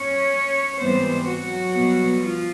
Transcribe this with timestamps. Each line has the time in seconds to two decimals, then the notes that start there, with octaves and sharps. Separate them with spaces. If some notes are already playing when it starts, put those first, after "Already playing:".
Already playing: C#4 C#5
0.79 G#2 E3 G3 B3 C4 C5
1.26 F#3 F#4
1.73 B2 G3 B3
2.20 F3 F4